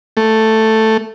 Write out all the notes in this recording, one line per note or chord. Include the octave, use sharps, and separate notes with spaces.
A3